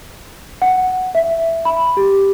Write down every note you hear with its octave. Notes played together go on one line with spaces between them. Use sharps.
F#5
E5
B5
G4